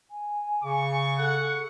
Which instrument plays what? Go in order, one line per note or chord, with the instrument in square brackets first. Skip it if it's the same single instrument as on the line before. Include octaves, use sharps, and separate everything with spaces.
[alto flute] G#5
[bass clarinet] C#3 [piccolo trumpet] C#6
[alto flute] A4 [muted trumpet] F#5